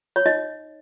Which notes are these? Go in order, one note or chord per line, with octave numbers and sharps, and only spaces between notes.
C#5
D#4 D#5